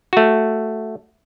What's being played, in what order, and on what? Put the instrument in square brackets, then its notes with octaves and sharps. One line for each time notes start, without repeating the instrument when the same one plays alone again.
[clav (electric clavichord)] A3 F#4